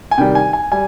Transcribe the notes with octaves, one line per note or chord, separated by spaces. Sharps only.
G#5
C3 D#3 G3 G5
G#5
G#5
G3 G#5